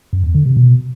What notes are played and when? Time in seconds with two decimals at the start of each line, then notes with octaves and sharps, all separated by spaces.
0.13 F#2
0.24 E2
0.35 D3
0.46 C3
0.57 B2